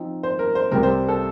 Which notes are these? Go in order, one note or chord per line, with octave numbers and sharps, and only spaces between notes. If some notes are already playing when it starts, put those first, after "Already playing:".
Already playing: F3 C4 D#4
C5
A#4
C5
C2 C3 G3 C4 G4 A#4
C5
A4